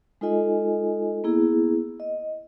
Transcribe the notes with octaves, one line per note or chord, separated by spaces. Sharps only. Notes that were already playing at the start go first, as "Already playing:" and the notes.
G#3 D#4 F4 A4 D#5 G#5
A#3 B3 E4 G#4
D#5